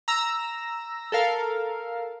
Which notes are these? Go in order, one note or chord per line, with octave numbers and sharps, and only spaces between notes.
A#5 E6 A#6
A4 A#4 F5